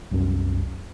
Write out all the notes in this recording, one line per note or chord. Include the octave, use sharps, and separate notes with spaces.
C2 F#2